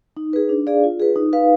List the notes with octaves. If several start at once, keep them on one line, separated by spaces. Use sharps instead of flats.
D#4
G#4 B4
D4
G#4 D5 F5
F4
G#4 B4
D#4
B4 F5